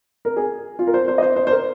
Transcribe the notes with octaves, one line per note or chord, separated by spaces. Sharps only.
A#4
G#4
F4
A#4
C5
C5
D#5
C5
C5
C5
A#4